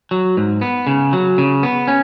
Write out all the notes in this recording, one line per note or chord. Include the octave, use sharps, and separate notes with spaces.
F#3
G#2
B3
C#3
F#3
C#3
B3
C#4